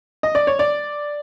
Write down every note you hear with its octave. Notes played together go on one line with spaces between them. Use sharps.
D#5
D5
C#5
D5